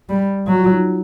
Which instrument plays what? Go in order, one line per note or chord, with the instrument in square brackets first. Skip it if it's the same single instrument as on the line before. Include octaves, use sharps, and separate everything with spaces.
[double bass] G3
[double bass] F#3 [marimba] F#4
[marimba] F4
D#4